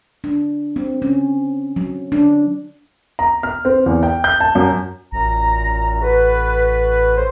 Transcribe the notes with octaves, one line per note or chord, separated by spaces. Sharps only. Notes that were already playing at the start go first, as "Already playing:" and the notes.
D4
C4
C#4
F#3
D4
A#5
F6
C4
E2
G5
G6
A5
F#2
A1 F#2 A#2 A#5
F#4 A4 B4
C#4 A4 C5